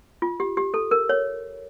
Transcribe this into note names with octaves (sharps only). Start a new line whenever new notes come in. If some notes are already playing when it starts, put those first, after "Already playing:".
F4
G4
G4
A4
A#4
C#5